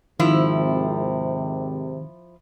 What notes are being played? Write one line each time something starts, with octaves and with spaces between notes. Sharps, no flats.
G#1 C3 D#3 F3 E4